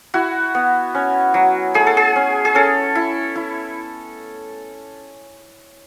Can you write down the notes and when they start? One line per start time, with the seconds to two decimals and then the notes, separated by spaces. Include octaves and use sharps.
0.14 E4 F#4
0.55 B3
0.95 C#4
1.34 F#3
1.74 A3 G#4
1.87 A4
1.97 G#4
2.16 C#4
2.45 G#4
2.55 C#4 A4
2.95 E4
3.36 E4